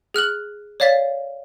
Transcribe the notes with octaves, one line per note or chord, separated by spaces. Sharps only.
G#4 F6 F#6 F#7
C#5 D5 F5 A6 B6